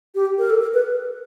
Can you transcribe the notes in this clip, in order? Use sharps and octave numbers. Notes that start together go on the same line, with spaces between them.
G4
A#4
A4
A#4
B4